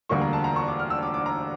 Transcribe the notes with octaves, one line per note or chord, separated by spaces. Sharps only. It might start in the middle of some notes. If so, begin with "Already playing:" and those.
E1 D2 D3 G3 A#3 C#6
A#5
A5
A#5
C#6
D6
F6
E6
D6
D6
A#5